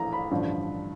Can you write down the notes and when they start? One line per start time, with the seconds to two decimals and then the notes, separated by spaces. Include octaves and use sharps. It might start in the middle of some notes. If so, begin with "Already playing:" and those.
Already playing: A#1 A2 E3 A#5
0.13 B5
0.31 A1 G2 D3 F3